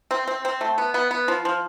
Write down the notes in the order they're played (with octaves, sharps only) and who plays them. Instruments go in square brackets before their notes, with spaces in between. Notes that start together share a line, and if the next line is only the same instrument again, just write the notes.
[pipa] C4
C4
C4
A3
B3
B3
B3
F3
F3